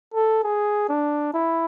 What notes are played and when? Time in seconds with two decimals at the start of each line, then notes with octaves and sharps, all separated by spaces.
0.14 A4
0.44 G#4
0.89 D4
1.34 E4